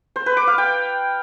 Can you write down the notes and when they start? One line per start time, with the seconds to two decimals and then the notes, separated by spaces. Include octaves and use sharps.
0.16 C5
0.26 B4
0.37 D6
0.47 F5
0.58 G5